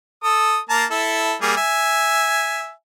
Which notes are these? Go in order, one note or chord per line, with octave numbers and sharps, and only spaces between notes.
A4 D#6
A#3 A5 A#5
E4 A4
G3 A#3 G#4
E5 G#5